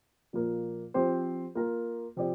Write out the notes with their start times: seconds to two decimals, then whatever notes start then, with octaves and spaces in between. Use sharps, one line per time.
0.33 A#2 F3 A#3
0.94 F3 C4 G4 C5
1.55 A#3 F4 A#4
2.16 C3 F3 C4 G4 D5